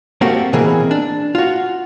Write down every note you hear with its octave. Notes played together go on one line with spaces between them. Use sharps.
A3 A#3 C4 F#4 G4
B2 E3 A#3 C4 G#4
D4
F4 F#4